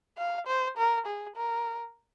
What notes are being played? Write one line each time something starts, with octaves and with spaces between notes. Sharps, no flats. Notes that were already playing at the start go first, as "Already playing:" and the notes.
F5
C5
A#4
G#4
A#4